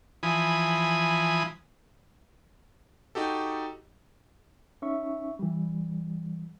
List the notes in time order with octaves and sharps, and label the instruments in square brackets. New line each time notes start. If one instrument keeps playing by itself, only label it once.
[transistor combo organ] E3 F3 G#5 B5 D#6
[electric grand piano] D#4 F#4 G4 A4
[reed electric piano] C#4 D#4 E5 C#6
E3 G3